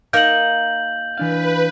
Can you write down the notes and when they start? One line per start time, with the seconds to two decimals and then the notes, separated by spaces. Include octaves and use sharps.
0.13 A#3 D#4 A#4 G6 F#7
1.18 E3 D4 B4 F5